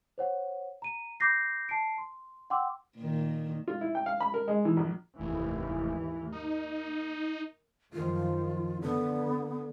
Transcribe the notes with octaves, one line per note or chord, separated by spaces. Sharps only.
C5 C#5 F#5
A#5 D#7
B5 D6 G6 A#6 C7
A5 C7 D7
C6
F#5 G5 C6 D6 E6
A#2 D#3
F4
E4
G5
F5
B5
A#4
G#3
E3
A#1
F1 D#2 G#2 E3
A#3 D#4
F#2 D#3 F3 F4
D3 B3